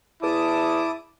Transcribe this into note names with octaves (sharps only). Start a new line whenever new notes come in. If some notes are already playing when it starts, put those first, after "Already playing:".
E2 E4 A5 D6 D#6